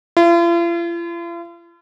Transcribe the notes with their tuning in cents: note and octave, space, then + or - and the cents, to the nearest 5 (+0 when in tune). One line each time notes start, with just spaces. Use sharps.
F4 -45